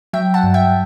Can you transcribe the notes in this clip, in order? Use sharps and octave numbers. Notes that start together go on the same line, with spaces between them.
F#3 E5 G5
F#5 A5
G2
E5 G5